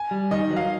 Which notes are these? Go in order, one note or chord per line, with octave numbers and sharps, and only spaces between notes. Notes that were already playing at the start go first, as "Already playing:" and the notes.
Already playing: G#5
G3
D#3 D#5
F#3
F5